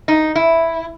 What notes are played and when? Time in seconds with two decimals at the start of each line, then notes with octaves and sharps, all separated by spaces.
0.08 D#4
0.35 E4